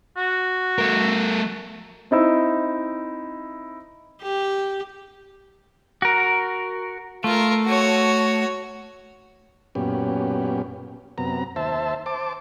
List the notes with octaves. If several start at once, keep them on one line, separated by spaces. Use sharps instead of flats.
F#4
A3 A#4
C4 D#4 E4 E6
G4
F#4 A#4
A3 F4 A#4
F#4 C#5
F#2 A#2 B3 C#4 G4
F#2 C3 B3 A#5
D#2 C5 E5 A5
C5 A5 D6